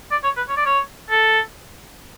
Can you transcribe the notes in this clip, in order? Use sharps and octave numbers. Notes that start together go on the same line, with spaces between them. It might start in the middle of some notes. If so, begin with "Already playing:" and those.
D5
C#5
B4
C#5
D5
C#5
A4